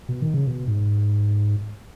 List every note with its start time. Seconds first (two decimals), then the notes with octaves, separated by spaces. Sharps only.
0.09 B2
0.22 D#3
0.34 C#3
0.47 B2
0.67 G#2